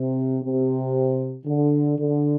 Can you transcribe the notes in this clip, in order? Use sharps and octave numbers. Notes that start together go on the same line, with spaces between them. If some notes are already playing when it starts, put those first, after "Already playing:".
Already playing: C3
C3
D3
D3